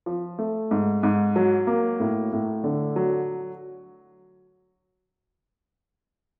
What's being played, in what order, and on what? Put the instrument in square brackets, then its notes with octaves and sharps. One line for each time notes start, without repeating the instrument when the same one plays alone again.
[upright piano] F3
A3
G#2
G#2
F#3
A#3
A2
A2
D3
F#3